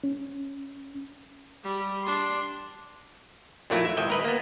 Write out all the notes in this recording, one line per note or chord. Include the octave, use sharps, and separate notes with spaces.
C#4
G3
D4 C6
F2 A#2 F#3 A3 A#3 E4
E5
G1 A2 D#5 E5 G5
A#4 B4 D#5
A#3 B3